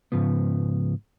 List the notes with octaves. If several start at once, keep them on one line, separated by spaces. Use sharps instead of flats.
G#2 C#3 F3 B3